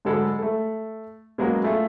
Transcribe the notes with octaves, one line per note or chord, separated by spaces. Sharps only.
G#2 D3 F#3 G#3 A4 B5
A3 A4
B2 F#3 G#3 A#3 C#4 F#4
A3 F4 G#4